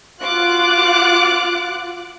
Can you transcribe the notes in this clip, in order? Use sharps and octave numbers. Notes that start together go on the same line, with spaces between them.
F4 F#4 D6 F#6 D7